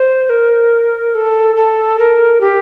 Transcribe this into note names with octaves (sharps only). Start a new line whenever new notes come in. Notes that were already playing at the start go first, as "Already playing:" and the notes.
Already playing: C5
A#4
A4
A4
A#4
G4